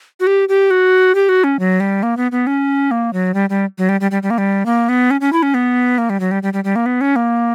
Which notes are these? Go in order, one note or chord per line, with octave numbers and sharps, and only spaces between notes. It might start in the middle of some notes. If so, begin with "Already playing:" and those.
F#4
G4
G4
F#4
G4
F#4
C#4
F#3
G3
A#3
B3
B3
C#4
A#3
F#3
G3
G3
F#3
G3
G3
G3
G3
A#3
G3
A#3
B3
C#4
C#4
E4
C#4
B3
A#3
G3
F#3
G3
G3
G3
G3
A#3
B3
C#4
A#3